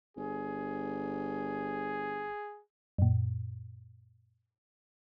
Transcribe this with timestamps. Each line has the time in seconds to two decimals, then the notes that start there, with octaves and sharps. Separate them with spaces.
0.17 G1 G#4
2.98 F#2 A#2